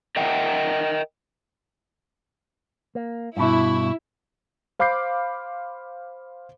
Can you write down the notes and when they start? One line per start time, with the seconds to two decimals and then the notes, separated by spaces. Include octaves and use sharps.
0.16 A#4 D#5 E5 F#5 G5
2.95 A#3
3.37 G2 B2 E4
4.79 C5 F5 B5 D6 G6 C7